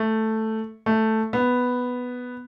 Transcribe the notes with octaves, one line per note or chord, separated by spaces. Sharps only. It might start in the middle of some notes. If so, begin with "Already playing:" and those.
Already playing: A3
A3
B3